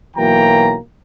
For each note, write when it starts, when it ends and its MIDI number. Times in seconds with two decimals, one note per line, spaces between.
0.16 0.76 35
0.16 0.76 52
0.16 0.76 54
0.16 0.76 58
0.16 0.76 79
0.16 0.76 82